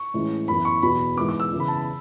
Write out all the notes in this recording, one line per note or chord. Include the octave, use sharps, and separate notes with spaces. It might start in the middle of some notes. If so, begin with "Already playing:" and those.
Already playing: C#6
A2 E3 G#3 C#4
F#2 E3 B3 B5
C#6
E2 B2 F#3 B5
G#2 E3 G#3 B3 D6
D6
E6
C#3 E3 B3
B5
A5
B5